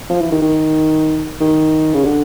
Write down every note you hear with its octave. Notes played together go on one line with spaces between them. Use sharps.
F3
E3
D#3
D#3
D#3
C#3
D3